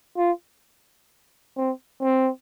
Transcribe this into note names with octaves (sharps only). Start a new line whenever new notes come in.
F4
C4
C4